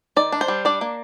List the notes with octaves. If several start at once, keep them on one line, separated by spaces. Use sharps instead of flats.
D#3 D5
D4
C5
G3
D4 D5
A#3